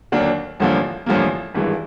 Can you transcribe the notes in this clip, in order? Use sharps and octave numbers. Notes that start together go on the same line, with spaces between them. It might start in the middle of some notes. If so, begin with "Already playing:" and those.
D#2 D3 F#3 A#3 D4
A1 G2 D3 F3 A#3
A1 G2 D3 F3 A#3
G#1 G2 E3 G#3